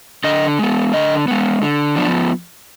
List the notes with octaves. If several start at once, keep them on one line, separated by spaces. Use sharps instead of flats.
D3 D#5
G#3 B3
D3 D#5
G#3 B3
D3
F3 B3 D4